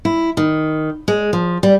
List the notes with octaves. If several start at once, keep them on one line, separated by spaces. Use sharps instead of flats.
E4
D#3
G#3
F3
G3